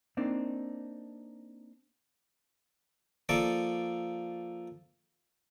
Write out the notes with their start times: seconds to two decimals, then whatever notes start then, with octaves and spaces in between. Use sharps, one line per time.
0.17 A#3 C4 D4 D#4
3.29 F3 A#3 A4 D5 C#6